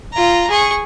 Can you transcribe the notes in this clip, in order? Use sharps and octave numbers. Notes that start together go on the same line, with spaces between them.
F4 A#5
G#4 C#6